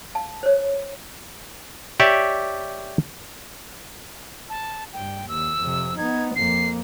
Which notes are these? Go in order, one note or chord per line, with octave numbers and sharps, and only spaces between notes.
F5 A5
C5 C#5
G4 C#5 D5 E5
A5
G2 G5
D#2 E6
F2 C3
B3 D#4 G#6
F2 A#3 C7